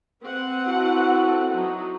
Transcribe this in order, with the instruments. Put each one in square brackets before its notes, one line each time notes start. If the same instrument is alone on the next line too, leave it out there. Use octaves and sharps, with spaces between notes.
[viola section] C4 B4 F#5
[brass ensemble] E4 F#4 A4
[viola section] F#3 D#4